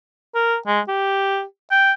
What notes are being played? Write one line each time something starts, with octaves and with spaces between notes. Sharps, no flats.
A#4
G#3
G4
G5